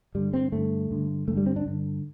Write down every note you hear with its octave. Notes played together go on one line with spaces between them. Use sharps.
G2 D3 G3
C4
G2 D3 A3
G2 D3
G2 D3 A3
G3
C4
D4
G2 D3